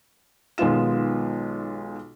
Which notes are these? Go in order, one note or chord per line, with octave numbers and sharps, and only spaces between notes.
B1 D#3 G#3 B3 F4 E7